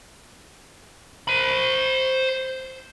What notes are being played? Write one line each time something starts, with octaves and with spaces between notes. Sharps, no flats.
C5 B5